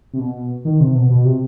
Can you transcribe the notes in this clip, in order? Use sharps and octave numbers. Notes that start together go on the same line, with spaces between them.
C3
B2
D#3
C3
B2
B2
C3